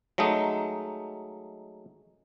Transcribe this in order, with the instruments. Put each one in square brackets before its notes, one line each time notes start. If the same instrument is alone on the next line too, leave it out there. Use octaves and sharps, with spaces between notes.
[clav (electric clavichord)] F#3 G#3 A3 D#4